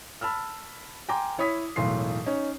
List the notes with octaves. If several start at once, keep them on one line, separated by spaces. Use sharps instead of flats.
A5 B5 E6 F6
G5 G#5 A#5 C6 D6
E4 C#5 B5 D#6 B6
E1 B1 A2 C6 C7
C#4 D#4 C#5